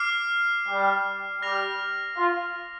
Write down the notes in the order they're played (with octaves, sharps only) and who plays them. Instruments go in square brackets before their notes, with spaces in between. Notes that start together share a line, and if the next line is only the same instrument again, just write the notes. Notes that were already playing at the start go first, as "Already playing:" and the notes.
Already playing: [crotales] D6 F6 C7
[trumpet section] G3 G4
[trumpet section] G3 G4 [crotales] F6 A#6 F7
[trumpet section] F4